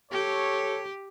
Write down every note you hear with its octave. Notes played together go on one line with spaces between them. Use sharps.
G4 A4 C#5